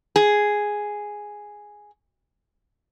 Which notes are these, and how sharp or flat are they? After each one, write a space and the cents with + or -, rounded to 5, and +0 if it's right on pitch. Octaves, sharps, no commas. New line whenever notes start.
G#4 +0